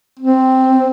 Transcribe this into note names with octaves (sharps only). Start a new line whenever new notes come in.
C4